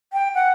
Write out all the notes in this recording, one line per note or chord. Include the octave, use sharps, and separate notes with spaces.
G5
F#5